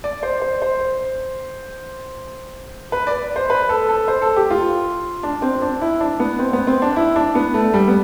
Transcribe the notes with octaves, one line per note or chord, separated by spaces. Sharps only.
D5
C5
C5
C5
B4
D5
C5
B4
A4
A4
C5
A4
G4
F4
D4
C4
D4
E4
D4
B3
C4
B3
C4
D4
E4
D4
B3
A3
G3
B3